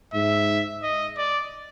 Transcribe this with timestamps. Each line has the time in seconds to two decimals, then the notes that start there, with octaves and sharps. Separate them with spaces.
0.14 G#2 E5
0.83 D#5
1.17 D5